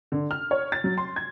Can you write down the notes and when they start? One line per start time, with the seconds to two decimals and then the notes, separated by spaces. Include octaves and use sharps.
0.12 D3
0.31 F6
0.51 C#5
0.72 A6
0.84 F#3
0.98 C6
1.16 G#6